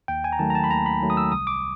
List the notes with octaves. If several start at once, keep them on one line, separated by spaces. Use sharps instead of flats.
D#2 G5
G#5
A#5
D#3 F#3 A3 A5
A#5
A5
B5
D#2 A#5
B5
D#3 F#3 A3
D#6
E6
C2 D#6
D6